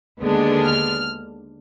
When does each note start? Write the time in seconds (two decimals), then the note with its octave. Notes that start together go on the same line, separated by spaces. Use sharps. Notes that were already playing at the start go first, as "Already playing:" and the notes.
0.20 D#2 D3 G#3 B3 D4
0.64 F6